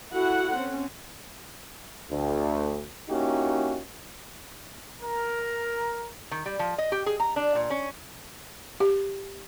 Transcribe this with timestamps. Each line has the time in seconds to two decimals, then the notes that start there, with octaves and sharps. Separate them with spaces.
0.12 E4 F#4 A4 F#5
0.55 C4 C#4
2.10 D2
3.09 A#3 C#4 D#4 E4 F#4 G4
5.00 A#4
6.31 D#3
6.46 G3
6.59 F3
6.78 D#5
6.92 G4
7.06 G#4
7.20 A#5
7.36 D4
7.55 A#2
7.70 C#4
8.80 G4